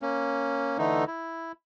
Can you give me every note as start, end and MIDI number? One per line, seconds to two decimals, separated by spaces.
0.02 0.78 58
0.02 0.78 61
0.78 1.05 50
0.78 1.05 52
0.78 1.05 57
0.78 1.05 63
1.07 1.52 64